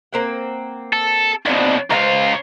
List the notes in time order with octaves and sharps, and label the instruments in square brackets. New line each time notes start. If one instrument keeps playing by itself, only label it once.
[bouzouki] A#3 C4 F#5
[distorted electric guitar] A4
[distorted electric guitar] D#2 B2 [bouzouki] C4 D4
[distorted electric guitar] C#2 F4 [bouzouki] C5 F5 A#5